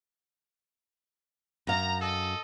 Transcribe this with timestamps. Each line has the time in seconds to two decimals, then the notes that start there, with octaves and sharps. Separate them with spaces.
1.67 F#2 F5 A#5
2.00 A4 D#5